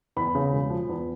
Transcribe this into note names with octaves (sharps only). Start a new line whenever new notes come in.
E2 B5
C#3
E1
F3
E2